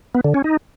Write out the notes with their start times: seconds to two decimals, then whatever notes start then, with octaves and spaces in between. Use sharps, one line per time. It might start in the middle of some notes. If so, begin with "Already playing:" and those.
0.15 B3
0.24 D3
0.34 C#4
0.44 D#4